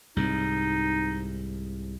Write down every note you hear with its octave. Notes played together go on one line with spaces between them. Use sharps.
C2 G#2 D#4